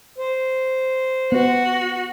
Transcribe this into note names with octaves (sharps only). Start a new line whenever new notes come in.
C5
B3 F#4